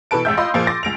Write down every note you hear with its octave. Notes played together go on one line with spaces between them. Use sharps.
B2 E3 A4 B4 A5 D7
A1 G#3 E5 E6 G6
F4 D#5 B5 C6
A#2 F3 A#3 G#4 D7
C6 D6 A6 A#6
C#2 D7 F7